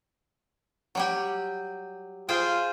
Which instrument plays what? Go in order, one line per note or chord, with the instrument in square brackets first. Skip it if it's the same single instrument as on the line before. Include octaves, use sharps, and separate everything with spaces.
[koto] F#3 G3 G4
[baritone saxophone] F4 [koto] G#4 C5 G5